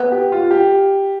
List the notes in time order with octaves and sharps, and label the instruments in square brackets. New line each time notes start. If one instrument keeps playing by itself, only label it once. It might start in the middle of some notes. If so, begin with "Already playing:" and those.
Already playing: [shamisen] B3
[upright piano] G4
F4
G4